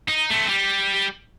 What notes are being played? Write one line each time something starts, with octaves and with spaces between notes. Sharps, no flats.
D#4
A3 C4
G3